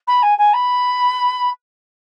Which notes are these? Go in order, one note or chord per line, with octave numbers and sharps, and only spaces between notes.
B5
G#5
G#5
B5